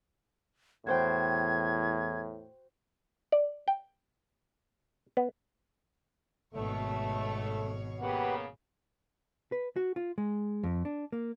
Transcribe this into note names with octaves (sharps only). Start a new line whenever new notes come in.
E2 A2 F#4 C5 G5 G#6
D5
G5
B3
G#1 B2 A3 C#5
C#3 A#3 B3 G4 B4 F#5
B4
F#4
F4
G#3
F2
D4
A#3